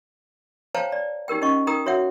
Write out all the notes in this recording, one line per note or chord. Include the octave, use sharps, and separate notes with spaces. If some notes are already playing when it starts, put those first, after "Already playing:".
C5 C#5 F5 G5 A5 A#5
D5
D#4 G4 A#4 G5
C#4 D#4 D#5 C#6
D#4 A#4 G5 A#5 D#6
F#4 C#5 E5 F#5